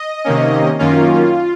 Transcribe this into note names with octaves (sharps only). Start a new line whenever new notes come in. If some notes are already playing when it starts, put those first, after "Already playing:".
Already playing: D#5
C3 D#3 A#3 C#4
F#2 D#3 A#3 C#4 F4